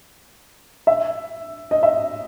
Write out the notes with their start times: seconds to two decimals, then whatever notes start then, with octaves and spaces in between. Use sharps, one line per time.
0.87 E5
1.71 D#5
1.83 E5